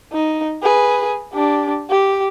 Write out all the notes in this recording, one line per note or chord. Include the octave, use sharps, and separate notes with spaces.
D#4
G#4 B4
D4 G4
G4